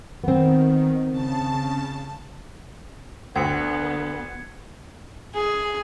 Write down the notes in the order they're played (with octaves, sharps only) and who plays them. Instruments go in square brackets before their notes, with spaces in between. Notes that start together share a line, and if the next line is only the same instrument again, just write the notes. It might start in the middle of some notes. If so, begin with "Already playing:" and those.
[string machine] D#3 [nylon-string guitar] B3 C4
[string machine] C#3 A5
[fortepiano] D2 [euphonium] D3 [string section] B3 [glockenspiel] G#6 C#7
[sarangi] G#4